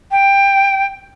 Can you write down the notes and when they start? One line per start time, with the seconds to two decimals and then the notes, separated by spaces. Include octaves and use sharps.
0.11 G5